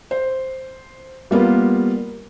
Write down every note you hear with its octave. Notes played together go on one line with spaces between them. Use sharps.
C5
G3 A#3 B3 F4